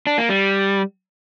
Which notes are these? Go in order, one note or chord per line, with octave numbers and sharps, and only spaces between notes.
D4
A#3
G3